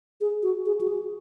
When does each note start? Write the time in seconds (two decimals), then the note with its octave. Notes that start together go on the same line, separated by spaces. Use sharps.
0.21 G#4
0.43 F#4
0.66 G#4
0.81 F#4
0.88 G#4